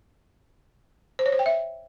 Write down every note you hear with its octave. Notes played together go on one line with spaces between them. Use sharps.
C5
C#5
C5
G5
E5